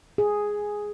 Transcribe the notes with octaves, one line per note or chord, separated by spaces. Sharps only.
G#4